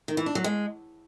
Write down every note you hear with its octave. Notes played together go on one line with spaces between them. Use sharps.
D#3
E3
D4
F#3
G#3